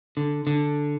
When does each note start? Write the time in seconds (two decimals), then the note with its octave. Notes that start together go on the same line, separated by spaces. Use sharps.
0.17 D3
0.47 D3